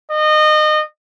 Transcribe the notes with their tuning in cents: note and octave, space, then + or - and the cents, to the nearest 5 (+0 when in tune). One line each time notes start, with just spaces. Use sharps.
D#5 -25